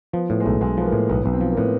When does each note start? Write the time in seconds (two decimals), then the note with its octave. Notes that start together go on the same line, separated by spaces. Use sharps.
0.13 F3 B3
0.29 A2 B3
0.40 G#3
0.45 B1 A3
0.61 B1 G#3
0.77 F3 B3
0.85 A#3
0.93 A2
1.09 B1 B3
1.23 B1 B3
1.33 C4
1.41 F3
1.52 A#3
1.57 A2 B3